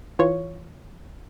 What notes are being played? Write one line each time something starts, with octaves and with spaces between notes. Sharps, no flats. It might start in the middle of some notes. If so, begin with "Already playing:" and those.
E3 F4 C#5